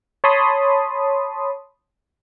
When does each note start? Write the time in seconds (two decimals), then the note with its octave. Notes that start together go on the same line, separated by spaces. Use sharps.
0.24 C#5 A5 B5 C6 D#6